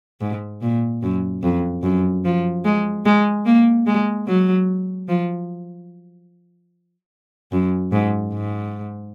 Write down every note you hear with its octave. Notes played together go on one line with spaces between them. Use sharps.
G#2
A#2
F#2
F2
F#2
F3
G#3
G#3
A#3
G#3
F#3
F3
F#2
G#2
G#2